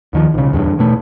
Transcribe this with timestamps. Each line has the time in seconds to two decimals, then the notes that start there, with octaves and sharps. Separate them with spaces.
0.13 D#2 D#3 F3
0.34 B1 C#3
0.52 D1 E2 G2
0.79 B2 A3